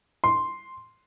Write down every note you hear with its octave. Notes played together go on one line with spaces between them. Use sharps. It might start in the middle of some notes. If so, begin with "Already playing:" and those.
C6